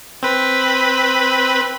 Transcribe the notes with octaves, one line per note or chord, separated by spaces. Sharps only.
C4 B4 B5